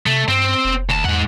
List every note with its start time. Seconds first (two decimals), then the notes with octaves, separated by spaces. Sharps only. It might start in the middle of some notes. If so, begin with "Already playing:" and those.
0.06 C3 A3
0.28 G2 C4
0.65 F1
0.89 D2 A5
1.05 E2 G#2 F#5